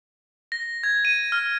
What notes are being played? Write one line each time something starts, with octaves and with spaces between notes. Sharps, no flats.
A#6
G#6
D#7
F6